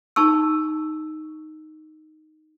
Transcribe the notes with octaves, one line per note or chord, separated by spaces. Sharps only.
D#4 A5 C#6 E6